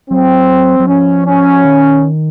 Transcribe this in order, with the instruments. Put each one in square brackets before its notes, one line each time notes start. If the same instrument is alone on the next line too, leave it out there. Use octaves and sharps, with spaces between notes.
[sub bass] F#3 [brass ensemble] C4
[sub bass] F#3
[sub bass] F3 [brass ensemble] C#4
[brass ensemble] C#4
[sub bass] D#3